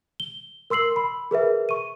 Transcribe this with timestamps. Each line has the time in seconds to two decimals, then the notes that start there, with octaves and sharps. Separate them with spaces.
0.20 G7
0.70 A#4 C6 E6 C7 F#7
0.96 B5
1.31 G#4 A#4 B4 E5
1.69 C#6 D#7